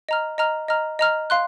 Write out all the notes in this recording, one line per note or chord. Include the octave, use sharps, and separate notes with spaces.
D#5 A#5 F6
D#5 A#5 F6
D#5 A#5 F6
D#5 A#5 F6
F5 C6 F#6